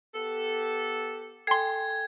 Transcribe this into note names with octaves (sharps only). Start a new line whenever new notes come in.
B3 G4 A4
A4 G5 G#5 C6 G#6 C7